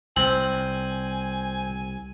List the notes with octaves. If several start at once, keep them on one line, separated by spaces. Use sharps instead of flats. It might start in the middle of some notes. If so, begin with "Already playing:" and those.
C2 C4 G#5 F#7